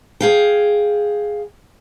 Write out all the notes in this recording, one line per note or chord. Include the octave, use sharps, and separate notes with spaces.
G#4 F5 G5